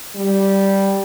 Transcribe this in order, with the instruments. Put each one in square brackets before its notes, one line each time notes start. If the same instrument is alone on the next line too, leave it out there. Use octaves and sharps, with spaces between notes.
[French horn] G3